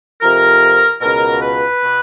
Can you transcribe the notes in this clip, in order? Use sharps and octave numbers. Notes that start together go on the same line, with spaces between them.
F2 C3 F3 A#4
C#2 B2 A#4
B4
B2